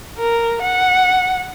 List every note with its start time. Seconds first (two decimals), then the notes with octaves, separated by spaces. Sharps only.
0.18 A#4
0.62 F#5